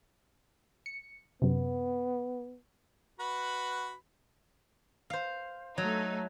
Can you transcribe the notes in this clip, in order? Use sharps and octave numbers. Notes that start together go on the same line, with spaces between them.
C#7
F#2 C3 B3
F#4 B4 B5
C5 F5
F#3 A3 D#4